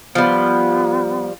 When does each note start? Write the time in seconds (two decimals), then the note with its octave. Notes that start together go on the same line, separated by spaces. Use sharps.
0.15 F3 G3 B3